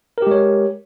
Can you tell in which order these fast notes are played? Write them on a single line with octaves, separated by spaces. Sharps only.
A#4 G4 G#3 C#5